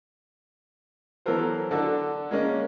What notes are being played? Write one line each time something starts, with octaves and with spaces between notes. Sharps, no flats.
E3 F#3 B3 A4 A#4 C5
D3 D4 F#4 A4
G#3 A#3 C#4